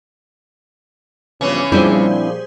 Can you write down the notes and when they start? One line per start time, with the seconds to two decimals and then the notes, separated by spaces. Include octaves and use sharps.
1.41 G2 C#3 E3 F3 B3 C#4 C#5
1.72 A#2 F3 G3 C4 D4 E4 G#4 C5